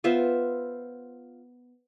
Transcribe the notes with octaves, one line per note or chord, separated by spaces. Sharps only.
B3 F4 C5 E5